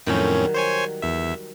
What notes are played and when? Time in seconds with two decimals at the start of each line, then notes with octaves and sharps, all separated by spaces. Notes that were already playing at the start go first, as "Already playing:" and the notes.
0.06 F2 A2 D#3 F#3 G3 C#4
0.54 C5 C#5 G#5
1.02 E2 E5